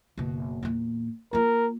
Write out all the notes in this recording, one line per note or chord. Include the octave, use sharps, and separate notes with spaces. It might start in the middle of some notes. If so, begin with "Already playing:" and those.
F#1 B2
E2 A#2
A#3 F4 A#4